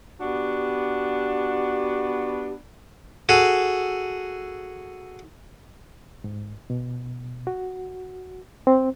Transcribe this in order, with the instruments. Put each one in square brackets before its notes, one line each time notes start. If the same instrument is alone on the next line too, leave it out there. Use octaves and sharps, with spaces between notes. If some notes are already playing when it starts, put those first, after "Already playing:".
[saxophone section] B3 D4 F#4 [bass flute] G4
[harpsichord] F#4 G#4 A4
[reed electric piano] G#2
B2
F#4
C4